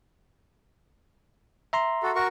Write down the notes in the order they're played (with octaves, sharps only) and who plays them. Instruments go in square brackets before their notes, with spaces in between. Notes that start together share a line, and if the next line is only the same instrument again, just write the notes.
[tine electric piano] E5 A#5 C6
[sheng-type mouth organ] F#4 A4
F#4 A#4 C#6